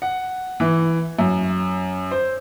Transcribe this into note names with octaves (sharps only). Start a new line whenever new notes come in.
F#5
E3
F#2
C5